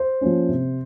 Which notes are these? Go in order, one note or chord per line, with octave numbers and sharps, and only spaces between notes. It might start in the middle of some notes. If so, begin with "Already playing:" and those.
Already playing: C5
F3 A#3 C#4
C3